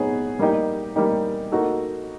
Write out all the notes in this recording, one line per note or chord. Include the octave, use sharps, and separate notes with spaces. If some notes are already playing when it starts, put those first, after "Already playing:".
Already playing: F#3 B3 D#4 G#4 C#5
G3 A#3 D#4 G4
G3 A#3 D#4 G4
A#3 D#4 F#4 A4